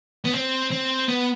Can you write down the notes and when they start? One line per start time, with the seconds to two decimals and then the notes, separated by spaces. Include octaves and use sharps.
0.25 B3
0.34 C4
0.71 C4
1.08 B3